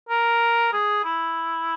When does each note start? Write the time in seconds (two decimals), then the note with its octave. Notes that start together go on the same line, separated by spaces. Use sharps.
0.09 A#4
0.73 G#4
1.04 E4